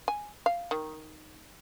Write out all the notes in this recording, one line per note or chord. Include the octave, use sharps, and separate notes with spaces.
G#5
F5
D#3